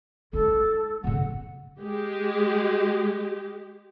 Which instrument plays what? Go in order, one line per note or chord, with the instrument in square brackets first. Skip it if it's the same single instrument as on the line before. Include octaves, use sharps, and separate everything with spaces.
[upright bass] G#3 D#4 [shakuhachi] A4
[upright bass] A1 C#3 [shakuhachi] F#5
[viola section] G#3 G4